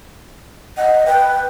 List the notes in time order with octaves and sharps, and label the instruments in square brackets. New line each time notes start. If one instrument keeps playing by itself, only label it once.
[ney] D#5 [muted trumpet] F#5
[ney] B4 [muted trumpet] G5